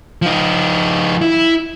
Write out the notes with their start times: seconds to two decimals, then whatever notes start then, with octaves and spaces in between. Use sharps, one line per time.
0.22 F3 D#4
1.21 E4